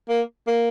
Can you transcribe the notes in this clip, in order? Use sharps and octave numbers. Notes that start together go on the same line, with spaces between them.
A#3
A#3